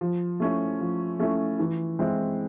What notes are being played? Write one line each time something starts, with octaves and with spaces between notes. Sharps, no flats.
F3
A3 C#4 E4
F3
A3 C#4 E4
E3
G#3 C4 E4